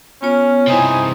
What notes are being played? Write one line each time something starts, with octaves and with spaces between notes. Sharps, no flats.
B3 C#4 F4 C#5
C3 E3 D#4 C5 G#5